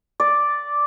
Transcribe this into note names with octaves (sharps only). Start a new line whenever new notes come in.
D5